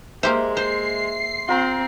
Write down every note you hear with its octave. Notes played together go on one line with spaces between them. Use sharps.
G#3 A#3 G4 C5 E5 C6
C5 C7
C4 F4 A#4